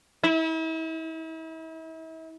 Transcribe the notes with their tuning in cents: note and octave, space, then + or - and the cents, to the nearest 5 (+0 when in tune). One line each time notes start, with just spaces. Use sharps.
E4 -40